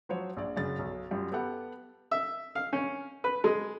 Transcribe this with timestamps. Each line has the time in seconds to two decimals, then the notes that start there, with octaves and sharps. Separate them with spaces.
0.09 F3 F#3 C5 C#5
0.37 A#1 D5
0.57 F#2 C#3 A6
0.79 B1
1.11 F#2 G3 F4 G4
1.32 B3 G4 A4 F#5
2.11 E5
2.55 F5
2.73 C#4
3.24 B4
3.44 G#3